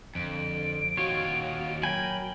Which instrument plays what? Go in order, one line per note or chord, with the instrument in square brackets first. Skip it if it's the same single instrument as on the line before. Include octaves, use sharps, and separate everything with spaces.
[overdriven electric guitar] F2 [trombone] D3 [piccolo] D7
[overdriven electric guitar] D#2 F4 [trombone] F#4 [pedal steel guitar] C#5
[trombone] F#3 [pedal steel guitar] A#4 G5 G#5 [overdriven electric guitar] B5